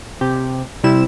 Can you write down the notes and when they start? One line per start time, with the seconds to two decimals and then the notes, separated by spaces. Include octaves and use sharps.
0.21 C3 G4
0.84 C3 G3 E4 E7